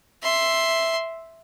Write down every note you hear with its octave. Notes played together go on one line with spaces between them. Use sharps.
E5 C6